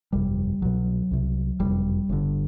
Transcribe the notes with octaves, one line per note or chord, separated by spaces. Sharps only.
G1 F2 C3 G3
C2 B2 F#3
C2 C3
F#1 F2 C3 G3
G1 G2 D3